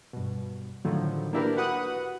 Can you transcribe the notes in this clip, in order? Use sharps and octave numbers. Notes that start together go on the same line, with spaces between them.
G2 B2
A2 D3 D#3 F3 F#3
A#3 D4 E4 G4 A#4 B4
F#4 B4 F#5 D#6 F#6